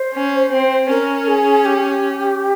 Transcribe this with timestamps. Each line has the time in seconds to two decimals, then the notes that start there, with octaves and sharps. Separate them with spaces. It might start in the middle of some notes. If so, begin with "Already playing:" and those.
Already playing: C5
0.13 C#4
0.51 C4
0.89 C#4 A#4
1.28 G#4
1.65 G4